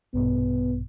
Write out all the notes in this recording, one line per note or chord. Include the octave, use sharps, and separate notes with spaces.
A#1 G2 B2 B3